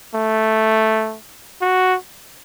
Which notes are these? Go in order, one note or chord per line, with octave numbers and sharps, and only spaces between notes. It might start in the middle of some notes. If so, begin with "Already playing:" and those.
A3
F#4